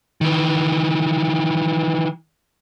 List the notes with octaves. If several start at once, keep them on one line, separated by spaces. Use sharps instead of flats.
D#3 E3